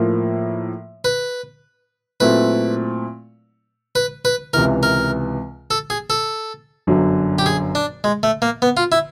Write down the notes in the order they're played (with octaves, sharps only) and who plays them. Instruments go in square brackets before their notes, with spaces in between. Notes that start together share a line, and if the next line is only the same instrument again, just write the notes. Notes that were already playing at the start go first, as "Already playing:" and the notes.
Already playing: [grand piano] A2 F3 A#3
[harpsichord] B4
[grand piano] A#2 F#3 A3 C4 E4 [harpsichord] B4
[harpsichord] B4
B4
[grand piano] C#2 C3 E3 [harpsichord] A#4
[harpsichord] A#4
A4
G#4
A4
[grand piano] G1 F#2 D3 F#3
[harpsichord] G4
G#4
D4
G#3
A3
A#3
B3
F4
E4